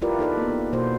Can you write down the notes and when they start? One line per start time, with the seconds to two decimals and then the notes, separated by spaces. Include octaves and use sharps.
0.02 E4 F4 G4 A#4 B4 D5
0.19 D#4 A4 B4 D5
0.37 A#3 B3
0.73 B2 A#3 F#4 B4 C5